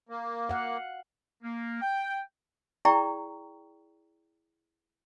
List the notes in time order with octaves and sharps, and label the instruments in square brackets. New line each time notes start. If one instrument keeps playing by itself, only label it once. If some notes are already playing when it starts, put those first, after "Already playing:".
[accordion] A#3
[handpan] F5 F#5
[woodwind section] A#3
G5
[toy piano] E4 G#4 D5 G5 A#5 C#6